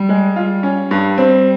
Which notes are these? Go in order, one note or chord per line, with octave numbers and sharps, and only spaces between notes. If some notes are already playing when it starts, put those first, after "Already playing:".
Already playing: G3
G#3
G3 F4
C#4
G2 G3
C4